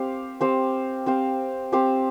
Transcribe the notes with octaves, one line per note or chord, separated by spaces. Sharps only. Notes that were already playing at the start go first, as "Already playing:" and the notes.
Already playing: C4 G4 C5 F5
C4 G4 C5 F5
C4 G4 C5 F5
C4 G4 C5 F5